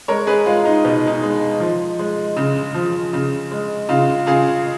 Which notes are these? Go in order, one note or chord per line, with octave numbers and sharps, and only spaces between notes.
G#3 A#4 C#5
G#4 B4
G#3 F4
D#4
B2 D#4
D#4
G#3
F3
G#3
C#3
F3
C#3
G#3
C#3 F4
C#3 F4 G#4